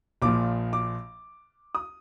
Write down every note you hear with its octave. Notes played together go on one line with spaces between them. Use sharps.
A#1 A#2 F3 D6
D6
D#6